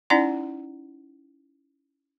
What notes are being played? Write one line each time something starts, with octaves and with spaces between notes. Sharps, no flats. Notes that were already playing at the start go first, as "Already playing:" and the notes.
C#4 D#4 E4 D5 F#5 A#5